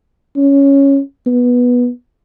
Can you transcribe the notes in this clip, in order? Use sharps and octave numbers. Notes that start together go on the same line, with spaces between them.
C#4
B3